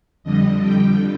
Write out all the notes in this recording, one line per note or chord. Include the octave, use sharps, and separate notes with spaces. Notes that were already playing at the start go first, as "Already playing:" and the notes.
F2 D3 G3 D#5
G5